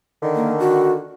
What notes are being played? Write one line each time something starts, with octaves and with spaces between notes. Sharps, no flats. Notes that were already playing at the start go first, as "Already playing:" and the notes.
D3 D#3
A#3
F#4